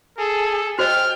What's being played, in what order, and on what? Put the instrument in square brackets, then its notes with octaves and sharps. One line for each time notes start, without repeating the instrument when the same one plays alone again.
[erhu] G#4 [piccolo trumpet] A4
[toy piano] F#4 C5 D#5 [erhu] G5 [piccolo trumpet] F6